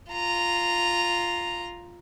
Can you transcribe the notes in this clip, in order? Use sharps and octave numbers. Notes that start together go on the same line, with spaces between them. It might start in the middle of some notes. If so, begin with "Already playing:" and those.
F4 A#5